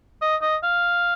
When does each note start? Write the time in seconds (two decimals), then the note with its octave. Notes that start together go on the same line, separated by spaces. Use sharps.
0.22 D#5
0.42 D#5
0.63 F5